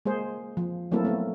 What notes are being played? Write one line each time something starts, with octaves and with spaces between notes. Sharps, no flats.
G#3 A#3 G#4 C5
F3
F#3 A3 A#3 C4 E4 A4
A3 B3 C4